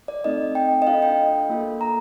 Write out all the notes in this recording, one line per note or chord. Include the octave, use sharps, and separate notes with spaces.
D5
A3 C4 D#4 A4 D#5
G5
D#5
D4 F4 A4 F5
G5
A#3 F4 A4
A#5